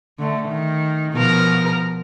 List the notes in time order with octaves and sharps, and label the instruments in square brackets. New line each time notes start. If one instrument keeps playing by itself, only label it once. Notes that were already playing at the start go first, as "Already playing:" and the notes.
[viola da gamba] D3 A3
D#3
B2 F3 A#4